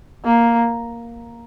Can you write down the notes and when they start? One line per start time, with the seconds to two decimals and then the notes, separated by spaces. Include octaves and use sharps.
0.25 A#3